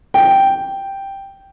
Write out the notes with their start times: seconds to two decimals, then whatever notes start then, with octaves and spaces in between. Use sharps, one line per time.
0.14 G5